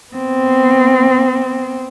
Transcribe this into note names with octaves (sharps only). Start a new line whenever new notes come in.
B3 C4